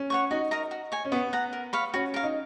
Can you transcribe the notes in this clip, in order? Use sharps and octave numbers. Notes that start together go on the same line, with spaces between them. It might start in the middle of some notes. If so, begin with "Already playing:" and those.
Already playing: C#4
C#5 F#5 C#6
D#4 F#4
A#4 D#5 A#5
F#4
C#5 G#5
C#4
B3 C#5
F#5 A#5
A#4
C#5 F5 B5
C#4 F#4
A#4 F5
D#4